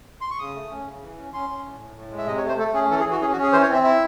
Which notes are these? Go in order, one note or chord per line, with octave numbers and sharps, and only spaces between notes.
C6
C#6
C#3 D#6
A3
C#4
C#3
E3
C#4
C#4 C6
C#4
A2
A2
A2
G#3
E5
C3 D#5
C#5
A3 C5
A3 A4
C#4 G#4
E3 A4
G#4
E3
F#4
C#4 G#4
F#4
C#4
G#4
E3 C5
C#5
C4 E5
E4 E5